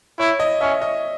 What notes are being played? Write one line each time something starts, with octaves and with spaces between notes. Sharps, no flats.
E4 C#5
D#5
C#4 E5
D#5